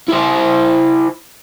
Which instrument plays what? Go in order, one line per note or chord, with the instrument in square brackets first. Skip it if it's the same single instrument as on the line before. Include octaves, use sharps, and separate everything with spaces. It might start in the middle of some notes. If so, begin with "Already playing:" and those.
[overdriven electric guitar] E4 C5